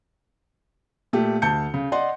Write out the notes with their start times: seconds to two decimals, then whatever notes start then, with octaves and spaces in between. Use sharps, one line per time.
1.13 A#2 A3 G4
1.42 D2 A5 G6 C#7
1.74 C#3
1.92 D5 D#5 F#5 C6